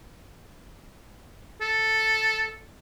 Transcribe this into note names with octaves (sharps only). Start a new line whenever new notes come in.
A4